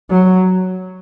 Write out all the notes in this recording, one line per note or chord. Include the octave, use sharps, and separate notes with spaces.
F#3